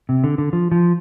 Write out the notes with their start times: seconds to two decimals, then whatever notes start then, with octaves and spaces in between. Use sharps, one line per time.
0.09 C3
0.24 D3
0.38 D3
0.53 F3
0.72 F3